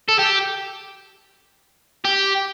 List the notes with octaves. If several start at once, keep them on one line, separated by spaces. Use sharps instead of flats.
A4
G4
G4